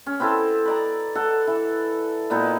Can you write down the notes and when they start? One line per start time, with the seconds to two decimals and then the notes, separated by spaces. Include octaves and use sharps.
0.06 C#4
0.20 B3 C4 E4 A4
0.65 B4 D5 A#5
1.15 A4 F#5
1.47 E3
2.30 A#2 B3 D#4 E4